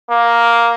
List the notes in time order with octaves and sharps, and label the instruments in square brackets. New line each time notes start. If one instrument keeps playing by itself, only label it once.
[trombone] A#3